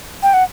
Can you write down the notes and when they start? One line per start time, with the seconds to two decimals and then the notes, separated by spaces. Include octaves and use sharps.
0.23 G5
0.34 F#5